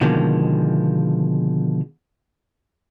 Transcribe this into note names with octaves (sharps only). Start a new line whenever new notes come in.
B2 D3 D#3 F3 G#3 A#3